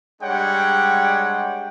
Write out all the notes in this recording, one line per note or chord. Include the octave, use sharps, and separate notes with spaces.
G3 G#3 D4 C#5 F#5 G5